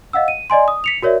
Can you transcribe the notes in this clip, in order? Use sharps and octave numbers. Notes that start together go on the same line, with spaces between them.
D#5 F5 F#5 E6
D#7
D5 D#5 G#5 C6
D#6
B6 C#7 F7
F#4 A#4 C#5 D5 E5